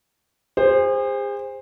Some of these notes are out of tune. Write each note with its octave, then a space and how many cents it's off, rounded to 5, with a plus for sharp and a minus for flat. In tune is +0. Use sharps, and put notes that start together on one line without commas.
G#4 -40 C5 +0